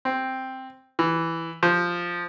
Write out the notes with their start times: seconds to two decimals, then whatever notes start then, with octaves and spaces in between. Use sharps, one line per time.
0.05 C4
0.99 E3
1.63 F3